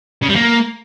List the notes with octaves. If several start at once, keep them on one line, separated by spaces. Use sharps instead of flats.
C#3
G3
A#3